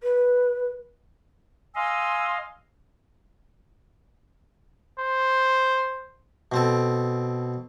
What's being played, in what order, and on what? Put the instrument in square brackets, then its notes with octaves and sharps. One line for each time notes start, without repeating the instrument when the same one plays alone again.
[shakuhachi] B4
[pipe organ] D#5 F5 [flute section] G#5 C6 E6
[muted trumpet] C5
[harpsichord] B2 C4 A4